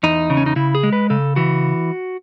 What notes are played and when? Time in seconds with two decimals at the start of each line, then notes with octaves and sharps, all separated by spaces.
0.03 E2 D#4
0.30 C#3
0.37 C#4
0.46 D#4
0.56 C#3 E4
0.75 G#4
0.83 G#3
0.93 B4
1.10 C#3 A4
1.36 E3 F#4